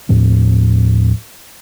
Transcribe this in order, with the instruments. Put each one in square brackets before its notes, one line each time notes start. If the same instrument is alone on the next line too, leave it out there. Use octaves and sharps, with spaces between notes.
[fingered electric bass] D#2 A2 F3 C4